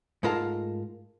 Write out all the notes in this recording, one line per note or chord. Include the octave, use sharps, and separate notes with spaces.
G#2 A3 F4 A#4 F5 A5